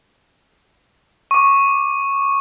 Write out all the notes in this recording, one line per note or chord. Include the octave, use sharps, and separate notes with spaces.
C#6 D6